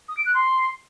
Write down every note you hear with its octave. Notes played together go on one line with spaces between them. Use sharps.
D#6
D7
F#6
C6